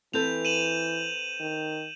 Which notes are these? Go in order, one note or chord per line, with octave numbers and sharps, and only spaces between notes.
E3 C4 A4 B4 G6 F7
D#7 E7 F#7
D#3